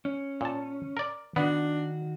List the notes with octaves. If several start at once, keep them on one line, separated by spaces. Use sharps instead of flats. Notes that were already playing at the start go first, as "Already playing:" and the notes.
C#4
A#2 A5
A#4 D5
D#3 B3 D4 F#4